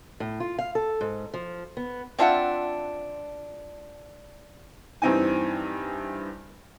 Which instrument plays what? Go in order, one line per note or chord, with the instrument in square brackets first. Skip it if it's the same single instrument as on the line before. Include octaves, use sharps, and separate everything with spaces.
[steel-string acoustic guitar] A2
F4
F5
A4
G#2
F3
B3
[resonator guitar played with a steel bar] C4 D4 F4 E5 F#5
[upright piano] G2 E3 C4 D#4 G#5